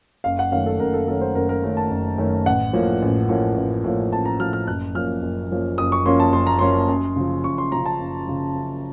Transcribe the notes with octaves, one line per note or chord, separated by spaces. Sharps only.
F#1 F5
F#5
F#2 D#3 A3 C#4 F5
A4
F#1 A#4
A4
F#2 D#3 A3 C#4 A4
C5
F#1 A#4
A#4
F#2 D#3 A3 C#4
A5
F#1
F#2 D#3 A3 C#4
A1 F#5
A2 F3 A#3 C#4
A1
A2 F3 A#3 C#4
A1
A2 F3 A#3 C#4
A1 A5
A#5
A2 F3 A#3 C#4 F6
F6
F#1 F#6
F#2 F3 A#3 C#4 F6
F#1
F#2 F3 A#3 C#4
F#1 D#6
C#6
F#2 F3 A#3 C#4 C6
A5
F#1 C6
A#5
F#2 F3 A#3 C#4 C6
F#2
C#3 F3
F#2 C#6
C6
C#3 F3 A#5
A5
F#2
C#3 F3
F#2